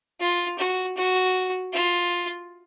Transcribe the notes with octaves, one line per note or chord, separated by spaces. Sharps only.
F4
F#4
F#4
F4